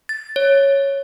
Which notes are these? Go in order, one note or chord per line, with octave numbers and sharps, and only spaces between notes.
A6
C#5